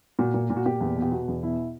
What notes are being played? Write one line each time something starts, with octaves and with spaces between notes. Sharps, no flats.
A#2 F#4
A#2
A#2
F#4
A#2 G4
E2
B2
G4
B2 F#4
E2
B2 E4